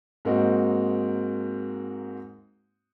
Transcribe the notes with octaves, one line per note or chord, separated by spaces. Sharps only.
G#2 A#3 C4 D#4 F#4